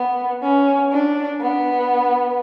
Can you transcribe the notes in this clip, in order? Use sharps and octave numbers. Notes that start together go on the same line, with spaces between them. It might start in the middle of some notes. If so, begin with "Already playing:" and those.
Already playing: B3
C#4
D4
B3